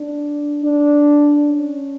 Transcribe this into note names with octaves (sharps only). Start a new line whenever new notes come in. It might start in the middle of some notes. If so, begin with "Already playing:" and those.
Already playing: D4
D4
C#4